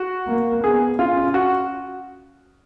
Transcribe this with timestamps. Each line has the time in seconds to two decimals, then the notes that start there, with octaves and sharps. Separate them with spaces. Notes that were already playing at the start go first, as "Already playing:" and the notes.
Already playing: F#4
0.28 A#3
0.64 B3 G#4
0.99 C#4 F4
1.34 F#4